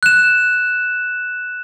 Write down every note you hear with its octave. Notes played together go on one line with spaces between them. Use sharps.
F#6 E7